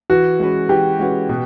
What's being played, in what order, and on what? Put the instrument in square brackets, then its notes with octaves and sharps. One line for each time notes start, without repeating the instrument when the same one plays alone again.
[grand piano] E3 [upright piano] F#4
[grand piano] G#3 C#4 F#4 B4
[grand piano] E3 [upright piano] G4
[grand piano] G#3 C#4 F#4 B4
B2